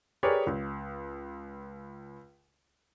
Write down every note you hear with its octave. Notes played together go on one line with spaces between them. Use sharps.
G4 G#4 A#4 B4 C#5 D5
C#2